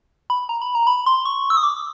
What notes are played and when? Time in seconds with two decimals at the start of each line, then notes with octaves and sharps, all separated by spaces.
0.30 B5
0.49 A#5
0.62 B5
0.75 A#5
0.87 B5
1.06 C6
1.25 C#6
1.50 E6
1.57 D#6
1.63 D6